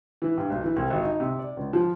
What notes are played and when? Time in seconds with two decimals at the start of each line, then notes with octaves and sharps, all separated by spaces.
0.22 E3
0.37 G2
0.50 B1
0.64 E3
0.76 C2
0.90 G#1
1.02 D#4
1.20 C3
1.39 D5
1.57 C#2
1.73 F3